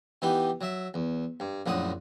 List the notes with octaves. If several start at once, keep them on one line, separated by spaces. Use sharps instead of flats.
E3 B3 D#4 G4
F#3 E5
E2
G2
A#1 F#2 A2 F#5 D#6